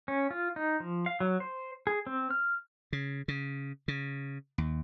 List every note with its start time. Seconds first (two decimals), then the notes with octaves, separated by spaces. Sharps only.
0.08 C#4
0.31 F4
0.56 D#4
0.80 F3
1.06 F5
1.20 F#3
1.40 C5
1.87 G#4
2.07 C4
2.31 F6
2.93 C#3
3.28 C#3
3.88 C#3
4.58 D#2